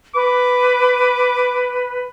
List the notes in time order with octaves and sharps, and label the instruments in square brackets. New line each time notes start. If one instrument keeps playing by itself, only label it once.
[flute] B4 [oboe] D6